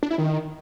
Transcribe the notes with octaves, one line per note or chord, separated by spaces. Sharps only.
D4
E4
D#3